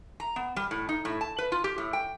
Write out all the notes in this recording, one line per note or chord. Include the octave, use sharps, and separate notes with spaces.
A#5
B3
G3
A2
D#4
A2
A5
B4
F4
G4
A2
G5